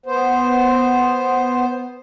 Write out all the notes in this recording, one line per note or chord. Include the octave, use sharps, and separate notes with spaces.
B3 C5